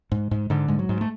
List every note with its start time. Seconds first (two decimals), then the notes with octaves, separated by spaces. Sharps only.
0.12 G#2
0.31 G#2
0.50 G#2 D3
0.68 G#2 G#3
0.79 F#3
0.89 G#2
1.01 A3